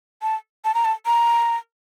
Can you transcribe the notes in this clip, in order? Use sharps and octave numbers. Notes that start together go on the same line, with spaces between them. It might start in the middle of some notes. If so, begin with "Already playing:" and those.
A5
A5
A#5
A5
A#5